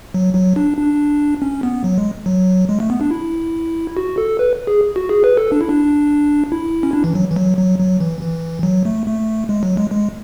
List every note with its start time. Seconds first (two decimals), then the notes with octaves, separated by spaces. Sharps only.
0.14 F#3
0.35 F#3
0.56 D4
0.78 D4
1.42 C#4
1.63 B3
1.84 F#3
1.98 G#3
2.26 F#3
2.69 G#3
2.80 A3
2.90 B3
3.01 D4
3.11 E4
3.97 F#4
4.18 A4
4.39 B4
4.67 G#4
4.96 F#4
5.09 G#4
5.24 B4
5.37 A4
5.52 D4
5.61 E4
5.69 D4
6.52 E4
6.83 C#4
6.93 D4
7.04 E3
7.15 F#3
7.31 E3
7.36 F#3
7.57 F#3
7.79 F#3
8.00 E3
8.21 E3
8.63 F#3
8.85 A3
9.06 A3
9.49 G#3
9.63 F#3
9.77 G#3
9.91 G#3